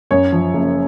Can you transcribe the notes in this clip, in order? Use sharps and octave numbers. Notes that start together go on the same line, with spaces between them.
F#2 C#5
F3
F#1